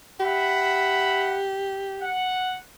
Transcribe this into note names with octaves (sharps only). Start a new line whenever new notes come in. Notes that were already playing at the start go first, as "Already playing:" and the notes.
G4 E5 F#5 B5
F#5